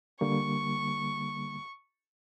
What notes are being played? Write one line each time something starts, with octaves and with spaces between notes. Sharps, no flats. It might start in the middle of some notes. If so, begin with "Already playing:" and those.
D3 G3 A#3 C#6